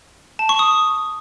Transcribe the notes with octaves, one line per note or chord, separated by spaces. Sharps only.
A5
C#6
D#6